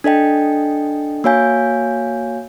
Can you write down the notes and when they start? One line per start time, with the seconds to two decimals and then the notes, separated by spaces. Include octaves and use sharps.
0.04 D4 A4 D#5 G5
1.24 A#3 F#4 C#5 F5 G#5 G6